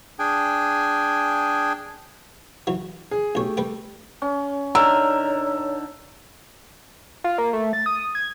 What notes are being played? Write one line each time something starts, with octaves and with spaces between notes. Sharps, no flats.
D4 G#4 G5 G#5
E3 F#3
G#4
B1 A3 G4 C#5
G3 B4 G5
C#4
D3 D#4 A#4 C#5 E6
F4
A#3
A3
A6
D#6
G#6